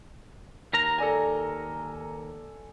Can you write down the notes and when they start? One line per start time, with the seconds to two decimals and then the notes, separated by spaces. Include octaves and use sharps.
0.73 D#2 A#4 A#5
0.98 A4 D5 G#5